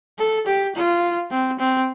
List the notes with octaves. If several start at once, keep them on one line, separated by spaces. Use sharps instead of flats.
A4
G4
F4
C4
C4